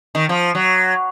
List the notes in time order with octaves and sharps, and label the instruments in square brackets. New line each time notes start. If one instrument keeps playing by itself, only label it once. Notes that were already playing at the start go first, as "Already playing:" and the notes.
[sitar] D#3
F3
F#3